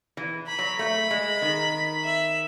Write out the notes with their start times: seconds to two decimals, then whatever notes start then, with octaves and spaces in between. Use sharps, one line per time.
0.17 E3
0.48 B5
0.59 F#3
0.79 A3 B5
1.11 G#3
1.42 D#3
2.04 E5